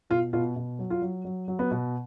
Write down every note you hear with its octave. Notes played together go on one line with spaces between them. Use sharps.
B2 F4
B2 F4
B2
F#3
F4
F#3
F#3
F#3
B3
B2